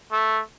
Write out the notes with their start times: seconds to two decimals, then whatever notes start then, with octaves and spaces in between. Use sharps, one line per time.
0.12 A3